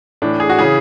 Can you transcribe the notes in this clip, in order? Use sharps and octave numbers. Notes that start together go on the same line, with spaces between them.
A2 E3 D4
G#4
F#4
C#3 E3 G#4